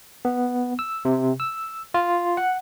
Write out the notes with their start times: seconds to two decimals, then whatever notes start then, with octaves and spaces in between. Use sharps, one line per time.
0.25 B3
0.79 E6
1.05 C3
1.40 E6
1.94 F4
2.37 F#5